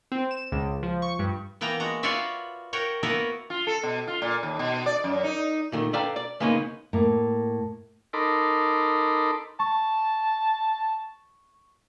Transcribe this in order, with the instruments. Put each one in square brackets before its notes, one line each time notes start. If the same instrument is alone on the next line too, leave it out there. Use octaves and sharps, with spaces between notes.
[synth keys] C4
E7
C#2
F3
C#6
G2
[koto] E3 A#3 B3 G5 A#5
G#3 F#4 A#5
F4 F#4 B4 C#5 D5 E5
F#4 A#4 C#5 G5
A#3 B3 E4 F#4 A#4 B4
[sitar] F4
A4
B2
F4
A#2
D#2
B2
D5
F#2
D#4
[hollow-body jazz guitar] A#2 D#3 A3
A4 B4 D5 F5 G5 A#5
D5
C#3 G#3 A#3 B3 C#4 D#4
[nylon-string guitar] A2 A#3
[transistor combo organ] D#4 A4 A#4 B5 C6 D6
[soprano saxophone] A5 [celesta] C#6